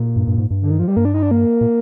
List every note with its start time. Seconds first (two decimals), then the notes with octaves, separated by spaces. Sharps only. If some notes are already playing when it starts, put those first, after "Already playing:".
Already playing: A#2
0.16 G2
0.27 G2
0.38 G#2
0.51 G2
0.62 D3
0.71 D#3
0.79 F3
0.88 G3
0.97 G2 A#3
1.05 D4
1.14 D#4
1.23 D4
1.31 A#3
1.61 A#2